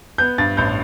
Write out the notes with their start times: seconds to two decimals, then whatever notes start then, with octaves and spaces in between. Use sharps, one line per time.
0.18 B3 G6
0.38 G2 A6
0.57 A1 G6